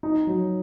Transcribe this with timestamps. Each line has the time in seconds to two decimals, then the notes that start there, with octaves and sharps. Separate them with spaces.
0.03 D#4
0.27 F#3